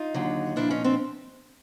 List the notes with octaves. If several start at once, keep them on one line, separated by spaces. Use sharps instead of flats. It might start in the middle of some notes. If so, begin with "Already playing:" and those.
Already playing: D#4 F4
D#2 D3 F#3
A#2 F3 D4 E4
C#4 D#4
C4 D4